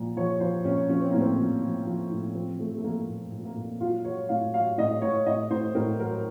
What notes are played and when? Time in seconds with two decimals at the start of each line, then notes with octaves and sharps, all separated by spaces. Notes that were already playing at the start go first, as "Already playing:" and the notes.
Already playing: A#2 F3
0.17 F3 C#5
0.40 F3 C5
0.64 A#2 C#4
0.89 F3 C#4
1.00 C4
1.10 A2 A#3
1.20 C4
1.38 F3
1.62 F3
1.86 F3
2.11 A2
2.34 F3 C4
2.59 F3 A3
2.77 A3
2.84 F3 A#3
3.08 A#2 A#3
3.32 A#2
3.45 A#3
3.56 A#2
3.80 F#3 F4
4.05 F#3 C#5
4.29 A2 F5
4.53 F#3 F5
4.78 A2 D#5
5.02 A2 C#5
5.26 A2 D#5
5.50 A2 C5
5.75 A2 A#4
5.99 F#3 A#4